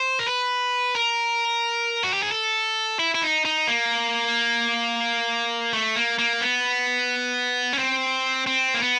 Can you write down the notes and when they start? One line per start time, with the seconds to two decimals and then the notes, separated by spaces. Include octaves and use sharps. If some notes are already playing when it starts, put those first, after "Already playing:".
Already playing: C5
0.19 A#4
0.26 B4
0.95 A#4
2.03 F#4
2.13 G4
2.23 G#4
2.32 A4
2.99 E4
3.15 E4
3.23 D#4
3.45 D#4
3.68 A#3
5.73 A3
5.96 A#3
6.19 A#3
6.41 B3
7.73 C#4
7.78 C4
8.47 C4
8.74 A#3
8.81 B3